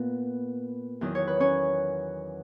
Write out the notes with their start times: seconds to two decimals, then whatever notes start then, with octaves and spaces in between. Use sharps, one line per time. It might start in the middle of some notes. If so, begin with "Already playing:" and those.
Already playing: A#2 B3 B4
1.01 E2 D#3 F#3
1.15 C#5
1.27 B4
1.40 C#4 C#5